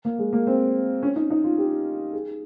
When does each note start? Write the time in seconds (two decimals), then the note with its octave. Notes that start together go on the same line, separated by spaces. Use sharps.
0.05 A#3
0.19 G#3
0.33 A#3
0.47 C4
1.03 C#4
1.16 D#4
1.31 D#4
1.44 F4
1.58 G4
2.13 G#4